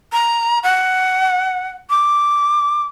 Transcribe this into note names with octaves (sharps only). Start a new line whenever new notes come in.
A#5
F#5
D6